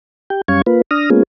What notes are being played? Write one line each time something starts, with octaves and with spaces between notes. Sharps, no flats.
G4 G5
F#2 G3 C#4 F5 C#6 G#6
A#3 F4 B4
D4 D#6 F6 A#6
G#3 A#3 B3 C#4 F4 G#4